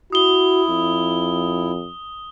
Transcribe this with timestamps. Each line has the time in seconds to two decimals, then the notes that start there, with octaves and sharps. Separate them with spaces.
0.12 E4 F#4 D#6 G7
0.70 F2